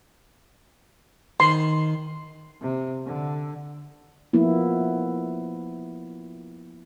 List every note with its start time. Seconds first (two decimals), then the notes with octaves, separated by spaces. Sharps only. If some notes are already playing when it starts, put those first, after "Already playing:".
1.40 D#3 C6
2.61 C3
3.05 D3
4.33 F3 A#3 B3 E4